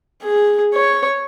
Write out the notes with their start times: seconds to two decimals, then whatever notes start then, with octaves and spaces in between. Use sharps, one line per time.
0.23 G#4
0.74 C#5